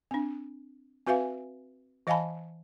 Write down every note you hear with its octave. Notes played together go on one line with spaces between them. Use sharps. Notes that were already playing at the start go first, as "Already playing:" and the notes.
C4 D4
C4 F#4 B4 E5 F5 G#5
E3 D#5 F5 G#5 A5 B5